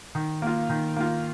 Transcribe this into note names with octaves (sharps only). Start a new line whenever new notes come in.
D#3
A#3 F4
D#3
A#3 F4